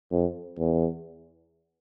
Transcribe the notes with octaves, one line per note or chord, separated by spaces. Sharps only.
F2
E2